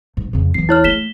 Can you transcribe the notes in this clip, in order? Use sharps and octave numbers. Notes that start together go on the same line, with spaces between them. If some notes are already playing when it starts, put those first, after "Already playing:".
G#2
F2 C#3
E2 E3 C7
E4 C#5 F6
A3 B6 E7 G7